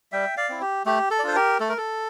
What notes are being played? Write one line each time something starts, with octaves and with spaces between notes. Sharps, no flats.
G3 E5 G5
D5 F5
C4 E4
G4
A3 G4
A4
D5
D4 F4 C5
G4 A#4
A3 A4
A#4
A4